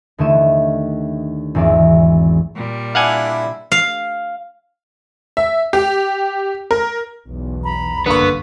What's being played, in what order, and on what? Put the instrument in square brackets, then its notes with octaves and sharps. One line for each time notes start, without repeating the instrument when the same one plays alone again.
[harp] D#2 D3 A3 E4 D#5 E7
G#1 E2 G#3 C4 D5
[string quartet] A#2 G3
[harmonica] D4 E4 [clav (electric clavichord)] F5 F#5 G#5
[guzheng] F5
[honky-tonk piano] E5
G4
A#4
[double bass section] B1 E2
[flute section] A#5 B5
[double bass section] F#1 G2 [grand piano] D3 A#3 C#6 [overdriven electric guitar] B3